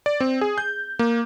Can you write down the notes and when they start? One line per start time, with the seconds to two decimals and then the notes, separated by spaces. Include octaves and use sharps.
0.06 D5
0.20 C4
0.41 G#4
0.58 G6
0.99 A#3